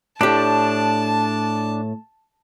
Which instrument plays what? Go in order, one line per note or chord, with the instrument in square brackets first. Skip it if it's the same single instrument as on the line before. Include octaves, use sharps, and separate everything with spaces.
[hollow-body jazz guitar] A2 G4 [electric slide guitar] D4 [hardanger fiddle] A5